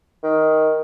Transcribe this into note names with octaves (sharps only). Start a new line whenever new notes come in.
D#3